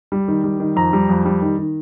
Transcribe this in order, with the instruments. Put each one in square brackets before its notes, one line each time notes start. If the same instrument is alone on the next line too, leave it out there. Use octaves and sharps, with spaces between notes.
[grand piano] G3
D#3
G3
D#3
F2 A#5
G3
F2
G3
D#3
D#3